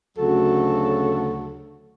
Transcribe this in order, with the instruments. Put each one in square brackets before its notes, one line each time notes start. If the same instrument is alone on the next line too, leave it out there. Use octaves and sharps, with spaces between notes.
[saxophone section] D2 C#3 F#3 F#4 A4